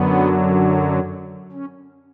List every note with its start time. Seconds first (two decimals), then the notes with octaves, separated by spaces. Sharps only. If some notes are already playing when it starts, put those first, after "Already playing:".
Already playing: F#2 D3 F#3 B3
1.52 C#4